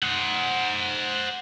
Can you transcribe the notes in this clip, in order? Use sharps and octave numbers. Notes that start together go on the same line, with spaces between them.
C5 F#5